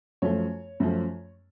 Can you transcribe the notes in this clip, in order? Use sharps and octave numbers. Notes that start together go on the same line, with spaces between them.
F#2 F3 A3 C#5
F#2 F3 A3